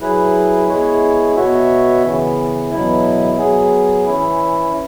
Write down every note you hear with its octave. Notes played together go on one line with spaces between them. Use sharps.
F#3 E4 G#4 B4
G#3 B3 E4 G#4 C#5
B2 B3 F#4 C#5 E5
C#3 E3 B3
E2 B2 F#3 B3 E4
F#3 B3 G#4
E3 C#4 E4